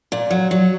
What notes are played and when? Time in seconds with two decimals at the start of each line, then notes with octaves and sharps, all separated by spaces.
0.12 A#2
0.31 F#3
0.51 F#3